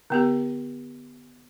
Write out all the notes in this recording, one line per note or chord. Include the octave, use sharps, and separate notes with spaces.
D3 B3 G4